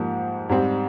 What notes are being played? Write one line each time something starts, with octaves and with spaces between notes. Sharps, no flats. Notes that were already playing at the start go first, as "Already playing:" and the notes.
Already playing: G#2 F3 A#3 G4
G#2 G3 C4